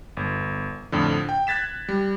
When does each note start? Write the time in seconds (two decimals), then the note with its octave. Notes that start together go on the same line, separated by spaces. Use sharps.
0.17 G1
0.92 F2 A2 D3
1.29 G5
1.47 F#6 G#6 A6 B6 E7
1.89 G3